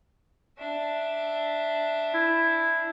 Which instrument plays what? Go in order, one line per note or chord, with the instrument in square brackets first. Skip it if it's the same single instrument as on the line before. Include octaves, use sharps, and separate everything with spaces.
[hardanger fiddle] D4 E5
[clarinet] E4